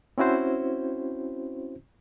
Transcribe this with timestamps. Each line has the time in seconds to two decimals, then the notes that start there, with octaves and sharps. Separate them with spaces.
0.18 C4 C#4 E4 F#4 C5